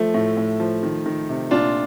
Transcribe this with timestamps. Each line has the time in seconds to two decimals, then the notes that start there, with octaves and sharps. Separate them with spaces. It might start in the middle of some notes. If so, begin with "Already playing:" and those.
Already playing: F3 A3
0.14 A2
0.37 A2
0.60 F3
0.83 D#3
1.06 D#3
1.29 C3
1.51 A#2 D4 F4